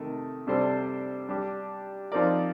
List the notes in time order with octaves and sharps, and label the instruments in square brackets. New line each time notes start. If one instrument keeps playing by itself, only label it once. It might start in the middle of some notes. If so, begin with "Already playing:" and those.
Already playing: [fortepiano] C3 D#3 A3
C3 G3 D4 A4 C5
G3 D4 G4
F3 C4 D#4 A#4 D5